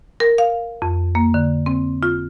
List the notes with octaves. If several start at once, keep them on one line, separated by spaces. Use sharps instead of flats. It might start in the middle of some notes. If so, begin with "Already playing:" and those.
A#4
F5
F2
A#3
D3
C4
F4